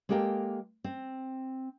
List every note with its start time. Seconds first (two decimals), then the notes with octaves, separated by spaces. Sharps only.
0.09 G#3 A#3 G4 A4 A#4 G5
0.84 C4